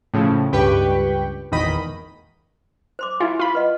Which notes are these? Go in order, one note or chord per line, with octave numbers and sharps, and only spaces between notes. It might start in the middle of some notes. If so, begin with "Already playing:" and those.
A2 C#3 F3
C#2 G2 G4 B4 G5 C#6
G#1 E2 A#2 D#3 D#5 B5
C5 C6 D6
E4 F4 G#5
F4 B5
B4 D#5 F#5